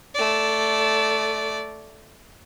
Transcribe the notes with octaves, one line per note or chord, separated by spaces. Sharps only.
A3 D5